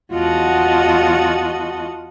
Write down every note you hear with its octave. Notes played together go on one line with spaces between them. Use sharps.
E2 F4 F#4 D#5 F#5 A5